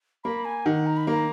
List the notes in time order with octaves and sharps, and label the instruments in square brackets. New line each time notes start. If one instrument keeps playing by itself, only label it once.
[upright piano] A#3 [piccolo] B5
[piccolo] G#5
[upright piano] D#3 [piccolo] F#5
[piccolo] A#5
B5
[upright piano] A#3 [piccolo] A#5